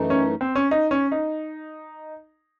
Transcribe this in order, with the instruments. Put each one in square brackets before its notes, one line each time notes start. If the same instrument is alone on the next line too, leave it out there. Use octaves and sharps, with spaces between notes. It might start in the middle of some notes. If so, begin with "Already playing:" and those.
Already playing: [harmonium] F#2 E3 A3 D#4
[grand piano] C#4
C4
C#4
D#4
C#4
D#4